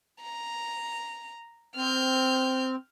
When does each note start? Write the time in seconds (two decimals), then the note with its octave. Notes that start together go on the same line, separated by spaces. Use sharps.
0.22 A#5
1.76 C4 F6 G6